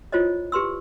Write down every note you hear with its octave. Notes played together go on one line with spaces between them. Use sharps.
E4 F4 C5 C#5 D#5
G4 B4 C6 E6